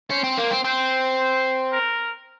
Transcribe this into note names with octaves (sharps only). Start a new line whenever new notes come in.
C#4 C5
C4
A#3
C4
C4 C5
C5
A#4